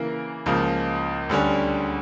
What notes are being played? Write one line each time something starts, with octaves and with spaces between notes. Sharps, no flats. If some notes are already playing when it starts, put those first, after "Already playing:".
Already playing: C#3 E3 A#3 E4 A#4
C#2 C#3 F3 A#3
D2 D3 G3 C#4